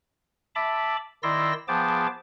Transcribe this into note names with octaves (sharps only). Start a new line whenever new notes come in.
E5 A5 B5 D6
D#3 E4 D5 C6 E6 A#6
F3 B3 G#4 G5 A5 D6